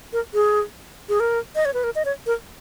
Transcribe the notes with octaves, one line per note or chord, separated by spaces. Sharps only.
A#4
G#4
G#4
A#4
D#5
C#5
B4
A#4
D#5
C#5
A#4